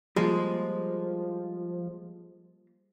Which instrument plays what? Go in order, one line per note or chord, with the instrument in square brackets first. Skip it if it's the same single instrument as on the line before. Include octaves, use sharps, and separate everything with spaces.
[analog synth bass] F3 [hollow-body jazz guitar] G3 A#3 F4 [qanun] G#3